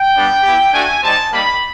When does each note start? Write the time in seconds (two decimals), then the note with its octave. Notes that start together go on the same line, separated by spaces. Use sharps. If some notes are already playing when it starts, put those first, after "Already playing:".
Already playing: G5
0.15 G3 B3 D4
0.43 B3 E4 G4
0.73 A3 D4 F#4 G#5
1.02 G3 C4 D#4 A5
1.31 G3 A#3 D#4 B5